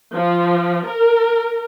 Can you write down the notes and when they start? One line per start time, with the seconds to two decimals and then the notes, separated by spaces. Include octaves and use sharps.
0.14 F3
0.87 A#4